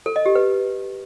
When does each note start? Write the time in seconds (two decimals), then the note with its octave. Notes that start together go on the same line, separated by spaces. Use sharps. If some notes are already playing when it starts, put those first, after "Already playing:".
0.06 A4
0.16 D#5
0.26 G4
0.35 B4